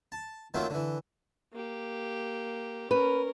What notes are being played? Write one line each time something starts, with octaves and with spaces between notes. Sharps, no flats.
A5
D#3 F#3 A3 A#3 C4 F4
D3 E3
A#3 G4
C#4 A#4 B4